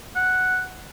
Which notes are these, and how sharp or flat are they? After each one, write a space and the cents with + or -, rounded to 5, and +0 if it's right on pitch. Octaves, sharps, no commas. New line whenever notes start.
F#5 +0